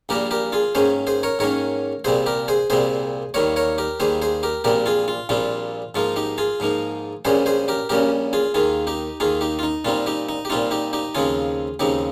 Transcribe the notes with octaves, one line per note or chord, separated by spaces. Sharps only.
A#1 A#2 G3 A#3 G4 A#4
G4 A#4
F4 G#4
G#2 D#3 A#3 C#4 G#4 C5
G#4 C5
A#4 C#5
G#2 D#3 A#3 C#4 A#4 C#5
C2 A#2 G3 C4 G#4 C5
G4 A#4
G#4 C5
C2 A#2 G3 C4 G#4 C5
D#2 D#3 G3 A#3 A#4 C#5
A#4 C#5
G4 A#4
D#2 D#3 G3 A#3 G#4 C5
G#4 C5
G4 A#4
A#1 A#2 G3 C4 G4 A#4
F4 G#4
F4
A#1 A#2 G3 C4 F4
G#2 F3 A#3 D#4 F4
D#4 G4
F4 G#4
G#2 F3 A#3 D#4
A#1 A#2 G3 C#4 G#4 C5
G#4 C5
G4 A#4
A#1 A#2 G3 C#4 G4 A#4
F4 G#4
D#2 D#3 A#3 F4 G#4
D#4 G4
D#2 D#3 A#3 F4 G#4
D#4 G4
F4
D#4
A#2 G3 C4 D#4 F4
D#4 G4
D#4
G4
A#2 G3 C4 D#4 F4
D#4 G4
D#4 G4
D#2 C#3 F3 C4 D#4 F4 G#4
D#2 C#3 F3 C4 D#4 G4